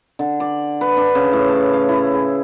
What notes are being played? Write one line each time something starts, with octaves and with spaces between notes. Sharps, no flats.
D3
D5
B4
D4
C#3
A2
A5
F5
E4
G#4